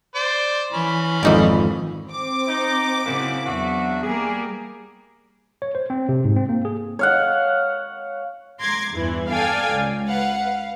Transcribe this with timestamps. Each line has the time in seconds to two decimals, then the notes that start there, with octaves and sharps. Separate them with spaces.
0.15 C5 D5
0.73 E3 C#4 B5
1.23 G#1 F2 A#3 D#4 D5
2.07 C4 D6
2.48 D#4
3.06 F#2 C#3 A#3 D#4 E4
3.46 E2 F#3 D4 F#4 E5
4.03 G3 A#3 G#4
5.62 C#5
5.75 C5
5.90 C4
6.09 C3
6.25 G#2
6.36 C4
6.49 A#3
6.65 G#4
6.99 C#5 F5 F#5
8.60 A#5 C6 D6 G#6
8.91 E2 G2 E3
9.31 A4 D5 F5 G5 G#5
9.72 C#2
10.08 B4 F5 F#5
10.43 F5